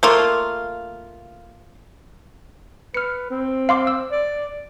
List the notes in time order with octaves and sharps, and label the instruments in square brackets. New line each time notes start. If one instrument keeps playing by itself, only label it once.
[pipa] A3 A#3 F4
[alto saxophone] B4 [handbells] F6 C#7
[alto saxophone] C4
[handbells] F5 C6 D6
E6
[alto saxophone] D5